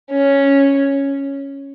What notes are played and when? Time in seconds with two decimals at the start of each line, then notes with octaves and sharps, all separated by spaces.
0.11 C#4